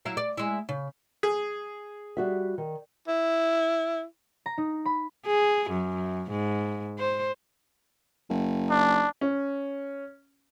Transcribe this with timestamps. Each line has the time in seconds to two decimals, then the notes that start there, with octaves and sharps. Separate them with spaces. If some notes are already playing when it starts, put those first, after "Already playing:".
0.05 F#3 E4 F5
0.17 D5
0.37 G#3 E4
0.69 C#3
1.23 G#4
2.17 G3 F#4 E5
2.58 D#3
3.08 E4
4.46 A#5
4.58 D#4
4.86 B5
5.27 G#4
5.70 F#2
6.31 G#2
6.99 C5
8.30 F#1
8.71 D4
9.21 C#4